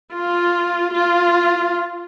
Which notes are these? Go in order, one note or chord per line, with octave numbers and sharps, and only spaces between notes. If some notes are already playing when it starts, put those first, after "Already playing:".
F4
F4